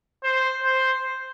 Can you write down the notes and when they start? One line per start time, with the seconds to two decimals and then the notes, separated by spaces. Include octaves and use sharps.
0.23 C5
0.64 C5